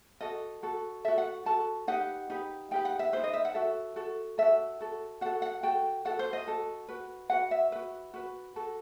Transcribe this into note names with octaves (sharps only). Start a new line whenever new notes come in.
F#4 A4 D#5
F#4 A4
F#4 A4 E5
F#5
F#4 A4 A5
D#4 G4 B4 F#5
D#4 G4 B4
D#4 G4 B4 G5
F#5
E5
D#4 G4 B4 C5
D#5
E5
F#5
F#4 A4 E5
F#4 A4
F#4 A4 E5
F#4 A4
F#4 A4 F#5
F#5
F#4 A4 G5
F#4 A4 F#5
C5
D#5
F#4 A4
F#4 B4
F#4 B4 F#5
E5
F#4 B4
F#4 B4
F#4 A4